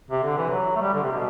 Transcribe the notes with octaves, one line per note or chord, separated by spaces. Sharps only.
C3
D3
E3
F#3
A3
G3
D3
C3
B2